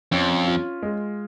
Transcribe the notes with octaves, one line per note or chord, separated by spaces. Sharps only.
F2 C#4
F4
G#3